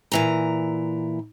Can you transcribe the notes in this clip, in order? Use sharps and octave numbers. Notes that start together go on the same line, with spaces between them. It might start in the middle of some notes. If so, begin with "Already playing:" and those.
A#2 E3 A#5